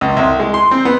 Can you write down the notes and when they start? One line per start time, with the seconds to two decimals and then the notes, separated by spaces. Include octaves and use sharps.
0.01 C#2
0.17 C2
0.39 G#3
0.54 C6
0.71 C4
0.85 B3